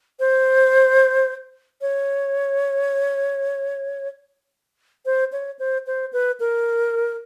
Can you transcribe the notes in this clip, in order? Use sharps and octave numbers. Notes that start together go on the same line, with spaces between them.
C5
C#5
C5
C#5
C5
C5
B4
A#4